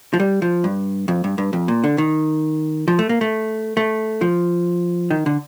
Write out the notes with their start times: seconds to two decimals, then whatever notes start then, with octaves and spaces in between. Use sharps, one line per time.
0.14 F3
0.20 G3
0.42 F3
0.64 G2
1.08 F2
1.24 G2
1.38 G2
1.53 F2
1.68 A#2
1.84 D3
1.98 D#3
2.88 F3
2.99 A3
3.09 A#3
3.21 A3
3.77 A3
4.21 F3
5.10 D#3
5.26 D3